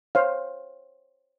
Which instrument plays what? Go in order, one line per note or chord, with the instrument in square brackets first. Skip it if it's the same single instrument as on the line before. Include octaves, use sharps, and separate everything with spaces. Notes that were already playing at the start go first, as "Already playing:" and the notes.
[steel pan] C5 C#5 F5